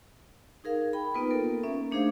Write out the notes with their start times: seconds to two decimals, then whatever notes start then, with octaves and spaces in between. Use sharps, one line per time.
0.64 D#4 G#4 A#4 F5
0.93 G5 B5
1.14 A#3 B3 D#4 F4 B4
1.30 A#3 A4 A#4
1.64 A#3 C#4 E5
1.92 A3 D4 D#4 G#4 C5 F5